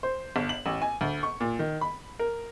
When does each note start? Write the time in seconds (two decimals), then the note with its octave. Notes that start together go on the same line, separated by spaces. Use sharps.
0.03 C5
0.36 G1
0.49 F#7
0.66 A1
0.82 G#5
1.01 D2
1.23 C#6
1.40 A#2
1.59 D#3
1.81 B5
2.19 A#4